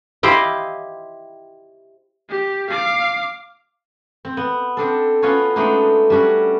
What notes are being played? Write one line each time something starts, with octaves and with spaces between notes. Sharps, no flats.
E4 G4 C5 D#5 F5
G4
F5 D6
C4
B3
C4 D4 A4
B3 C#4 F4 F#4 C#5
G#3 A3 B3 D4 D#4
G3 C#4 D4 F#4